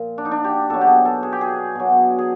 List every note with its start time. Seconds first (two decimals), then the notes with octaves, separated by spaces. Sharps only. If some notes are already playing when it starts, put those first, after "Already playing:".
Already playing: A#2 F3
0.18 D4
0.25 D#4
0.31 D4
0.44 G4
0.70 B2 F#3 A4
0.81 G4
0.87 G#4
1.05 A4
1.23 G#4
1.32 G4
1.41 G#4
1.75 B2 F#3
2.19 G#4